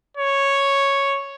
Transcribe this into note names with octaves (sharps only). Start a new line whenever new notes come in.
C#5